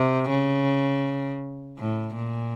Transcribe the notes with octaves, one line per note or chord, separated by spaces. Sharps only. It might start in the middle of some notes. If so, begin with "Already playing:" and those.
Already playing: C3
C#3
A2
A#2